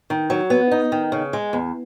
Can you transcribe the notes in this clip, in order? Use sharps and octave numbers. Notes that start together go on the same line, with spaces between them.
D#3
F#3
B3
D#4
D#3
C#3
G#3
E2